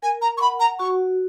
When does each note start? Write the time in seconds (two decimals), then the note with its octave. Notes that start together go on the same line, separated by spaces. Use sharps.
0.03 A#4 G#5
0.22 A#5
0.37 C#6
0.41 F#5 B5
0.60 A#5
0.79 F#4 C#6